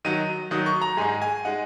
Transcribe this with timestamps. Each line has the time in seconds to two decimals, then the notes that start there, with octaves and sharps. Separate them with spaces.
0.05 D#3 F#3 D#4 D#7
0.51 D#3 F#3 D#4 D#6
0.66 C#6
0.82 A#5
0.97 G#2 G#3 D#4 G#5
1.22 G#5
1.45 G#3 D#4 F#5